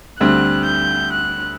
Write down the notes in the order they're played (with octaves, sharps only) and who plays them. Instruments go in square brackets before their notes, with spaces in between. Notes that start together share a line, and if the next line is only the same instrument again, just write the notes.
[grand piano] D2 D3 G3 C4 [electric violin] F#6
[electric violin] G6
F#6